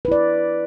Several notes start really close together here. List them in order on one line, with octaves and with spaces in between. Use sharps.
B4 E4 D5